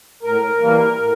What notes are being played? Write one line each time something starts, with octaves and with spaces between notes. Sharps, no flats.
A2 A#4
E3 G3 A#3
A2